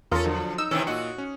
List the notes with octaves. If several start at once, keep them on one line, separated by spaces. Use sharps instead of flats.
E2 C#4 F4 A4 A#4 D#6
D3 F3 F#3
D#4 D#6 E6
C3 D#3 E3 C#4
A#2 F#4 D#5 C#7
C#4